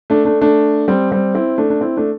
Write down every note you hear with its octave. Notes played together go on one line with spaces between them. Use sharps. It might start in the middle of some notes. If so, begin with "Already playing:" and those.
A3 D4
A3 D4
A3 D4
G3 C4
G3 C4
C4 E4
A3 D4
D4
C4 E4
A3 D4